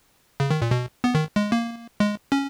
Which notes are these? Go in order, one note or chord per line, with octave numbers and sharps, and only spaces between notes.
C#3
D#3
A#2
B2
B3
D#3
G#3
A#3
G#3
C#4